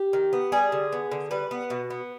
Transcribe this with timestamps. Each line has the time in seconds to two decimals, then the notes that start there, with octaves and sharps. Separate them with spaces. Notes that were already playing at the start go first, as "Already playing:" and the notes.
Already playing: G4
0.13 D#3
0.33 B3
0.52 G3 G#4
0.72 D3
0.92 B3
1.12 D3
1.31 G3 B4
1.51 B3
1.70 B2
1.90 B3